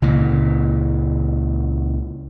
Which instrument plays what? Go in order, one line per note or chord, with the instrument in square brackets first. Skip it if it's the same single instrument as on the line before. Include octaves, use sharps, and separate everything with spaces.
[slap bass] C#2 A#2 E3